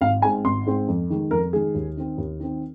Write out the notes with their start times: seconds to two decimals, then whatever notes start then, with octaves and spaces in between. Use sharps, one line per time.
0.01 G#1 F5
0.22 G#2 G#3 C4 G#5
0.45 G#1 C6
0.66 G#2 G#3 C4
0.88 F2
1.10 D#3 G#3
1.31 F2 A#4
1.53 D#3 G#3 G#4
1.75 D#2
1.97 D#3 C4
2.18 D#2
2.40 D#3 C4